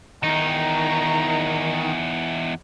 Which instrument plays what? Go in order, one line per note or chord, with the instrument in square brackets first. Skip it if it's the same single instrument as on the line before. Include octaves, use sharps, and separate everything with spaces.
[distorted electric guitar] E2 D#4 [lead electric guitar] D#3 [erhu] A#5